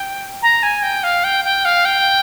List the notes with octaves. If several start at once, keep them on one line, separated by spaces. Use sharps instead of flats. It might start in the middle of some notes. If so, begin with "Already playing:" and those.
Already playing: G5
A#5
G#5
G5
F5
G5
G5
F5
G5